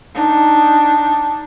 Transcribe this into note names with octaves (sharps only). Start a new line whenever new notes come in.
D4 D#4